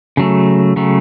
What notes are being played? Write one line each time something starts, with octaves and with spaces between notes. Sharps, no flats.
C#3 F#3 A3
C#3 F#3 A3